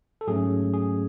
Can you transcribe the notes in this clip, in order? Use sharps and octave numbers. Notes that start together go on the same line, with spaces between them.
A4
G#2 F#3 A3 C#4 G#4
G#4